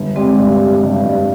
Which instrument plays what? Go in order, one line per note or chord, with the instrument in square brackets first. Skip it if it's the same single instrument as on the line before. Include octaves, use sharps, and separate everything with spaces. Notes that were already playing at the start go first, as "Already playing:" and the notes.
Already playing: [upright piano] G1
[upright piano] G3 [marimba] G#3 C4
[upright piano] G2
G3
G2
G2